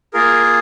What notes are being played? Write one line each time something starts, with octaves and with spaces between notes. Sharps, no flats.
A#3 F4 G#4 A#4